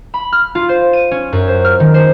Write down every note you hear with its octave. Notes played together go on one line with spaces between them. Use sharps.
B5
F6
F4
C5
D#7
C#4
F#2
C5
F6
D#3
C5